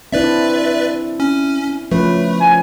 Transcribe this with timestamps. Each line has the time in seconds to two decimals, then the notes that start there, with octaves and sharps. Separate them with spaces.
0.13 C4 D4 E4 B4 D5 E5
1.20 C#4
1.91 F3 A3 C#4 B4
2.40 G#5